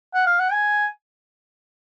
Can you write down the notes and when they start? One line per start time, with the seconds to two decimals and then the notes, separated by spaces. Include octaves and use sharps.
0.14 F#5
0.26 F5
0.39 F#5
0.52 G#5